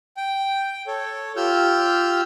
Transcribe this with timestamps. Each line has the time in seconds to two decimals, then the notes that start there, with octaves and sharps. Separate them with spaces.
0.17 G5
0.87 A4 C#5
1.36 F4 G4 E6 F6 G6